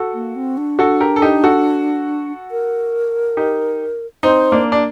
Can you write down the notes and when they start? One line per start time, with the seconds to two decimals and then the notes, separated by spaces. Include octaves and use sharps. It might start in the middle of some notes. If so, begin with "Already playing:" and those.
Already playing: F#4 A4
0.14 A#3
0.36 C4
0.57 D4
0.79 F#4 A4
1.00 G4 A#4
1.16 A4
1.22 D#4 G4
1.44 F#4 A4
2.51 A#4
3.37 D#4 G4
4.23 C4 D#4 C5
4.52 A#3 D4
4.72 D4